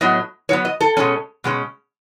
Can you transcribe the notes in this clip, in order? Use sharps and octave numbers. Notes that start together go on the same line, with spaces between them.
A2 F#3 B3 D#5
A2 F#3 B3 C#5
D#5
A4
B2 G#3 C#4
B2 G#3 C#4